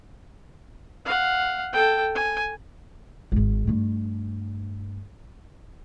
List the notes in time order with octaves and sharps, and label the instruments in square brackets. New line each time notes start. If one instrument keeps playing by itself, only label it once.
[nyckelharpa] F5 F#5
A4 G5
G#5
[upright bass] G#1 G#2
G2 A3